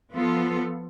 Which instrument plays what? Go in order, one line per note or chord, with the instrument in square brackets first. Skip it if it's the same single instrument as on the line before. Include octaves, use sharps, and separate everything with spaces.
[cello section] F3 B3 F4 A4